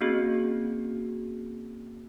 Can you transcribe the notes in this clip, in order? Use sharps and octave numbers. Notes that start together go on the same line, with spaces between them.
A#3 C4 C#4 F#4 G#4